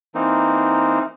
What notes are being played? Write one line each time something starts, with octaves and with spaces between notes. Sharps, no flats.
E3 A#3 C4 D#4